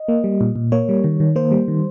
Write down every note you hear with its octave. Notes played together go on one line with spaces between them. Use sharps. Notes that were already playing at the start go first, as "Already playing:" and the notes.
Already playing: D#5
A#3
G3
A#2
A#2
A#3 C#5
G3
D#3
D#3
A#3 C5
G3
D#3